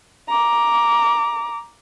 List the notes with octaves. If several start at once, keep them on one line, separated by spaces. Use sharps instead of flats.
A#5 D6